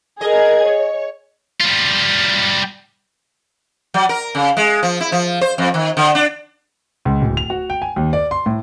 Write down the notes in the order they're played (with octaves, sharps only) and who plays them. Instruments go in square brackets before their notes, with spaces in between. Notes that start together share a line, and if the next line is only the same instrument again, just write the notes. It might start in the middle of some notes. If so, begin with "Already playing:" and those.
[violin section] G#4 A#4 G#6 [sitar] D#5
[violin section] C#5
[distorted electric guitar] G3 F4
[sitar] F#3
A#4
C#3
G#3
F3
E4
F3
C5
F2
D#3
D3
D4
[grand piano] C#2
D1
F7
F#4
G5
G#5
D#2
D5
C6
A2